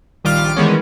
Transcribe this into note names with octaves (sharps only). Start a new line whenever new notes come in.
A#1 D#3 G3 F4 D6 F6
D#3 E3 G3 G#3 B3 C#4